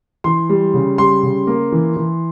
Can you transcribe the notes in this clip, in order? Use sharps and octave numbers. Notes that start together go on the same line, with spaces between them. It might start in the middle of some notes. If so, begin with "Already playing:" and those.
E3 C6
G3
C#3
G3 C6
C#3
A#3
E3
E3